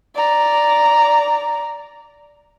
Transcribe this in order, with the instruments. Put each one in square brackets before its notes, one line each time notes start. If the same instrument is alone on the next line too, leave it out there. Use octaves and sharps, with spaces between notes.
[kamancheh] D5 A#5